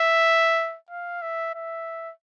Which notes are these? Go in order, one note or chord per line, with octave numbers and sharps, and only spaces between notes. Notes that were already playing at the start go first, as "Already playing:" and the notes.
Already playing: E5
F5
E5
E5